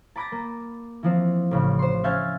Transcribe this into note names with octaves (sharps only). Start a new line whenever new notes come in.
A5 B5 D6 G6 A6 A#6
A#3
E3 F3 C4
A1 C#3
C5 C6
C#4 E5 F5 G#5 G6 A6